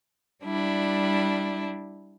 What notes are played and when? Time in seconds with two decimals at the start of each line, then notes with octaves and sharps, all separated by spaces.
0.44 G3 D4 E4